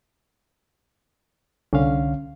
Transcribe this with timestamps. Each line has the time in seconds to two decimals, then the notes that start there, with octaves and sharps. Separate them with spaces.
1.73 C2 D3 C#4 F5